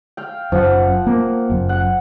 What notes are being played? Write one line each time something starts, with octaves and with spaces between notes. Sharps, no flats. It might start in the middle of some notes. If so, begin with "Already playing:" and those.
F5 G5
F#1 F#2 F3 F#5
A#3
F#1 F#2
F#5